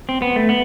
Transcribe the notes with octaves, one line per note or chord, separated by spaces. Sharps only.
C4
B3
A3
B3